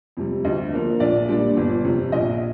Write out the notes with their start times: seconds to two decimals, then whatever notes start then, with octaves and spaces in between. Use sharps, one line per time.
0.17 F2 C3 G3
0.44 D2 D#5
0.73 D3 F3 A#3 D4
1.00 A#1 D5
1.29 A#2 G3 D4
1.57 G1
1.84 F2 C3
2.12 A#1 D#5